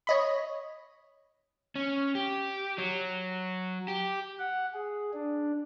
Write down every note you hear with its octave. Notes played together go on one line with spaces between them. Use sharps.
C#5 D#5 B5
C#4
G4
F#3
G4
F#5
G#4
D4